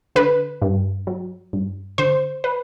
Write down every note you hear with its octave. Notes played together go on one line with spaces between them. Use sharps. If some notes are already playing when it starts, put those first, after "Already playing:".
D3 B4
G2
F#3
G2
D3 C5
B4